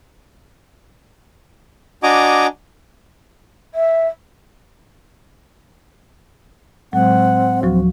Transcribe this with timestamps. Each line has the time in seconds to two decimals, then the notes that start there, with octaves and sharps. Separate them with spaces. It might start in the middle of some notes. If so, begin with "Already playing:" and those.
2.03 D4 F#4 D#5 G#5 A#5 D6
3.74 E5
6.93 A2 F#3 G#3 C4 F#5
7.63 D2 F3 F#3 F#4